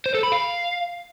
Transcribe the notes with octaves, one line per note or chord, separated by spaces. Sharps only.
C5
A4
B5
F5